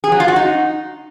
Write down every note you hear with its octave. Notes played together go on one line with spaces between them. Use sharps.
G#4
F#3
F4
F#4
D#4